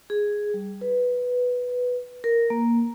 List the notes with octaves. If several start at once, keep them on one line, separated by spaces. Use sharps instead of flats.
G#4
G3
B4
A#4
A#3